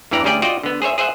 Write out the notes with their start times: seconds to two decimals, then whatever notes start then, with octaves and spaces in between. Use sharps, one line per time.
0.11 E2 G2 E3 G4 D5 A#5
0.24 D2 G3 C#4 G#4 D5 G5
0.42 F4 F#4 D5 D#5 G5
0.63 D3 B3
0.82 G#4 C5 C#5 E5
0.98 G#4 C5 E5 F#5